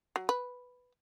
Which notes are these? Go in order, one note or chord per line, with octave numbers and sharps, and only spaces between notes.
F#3
B4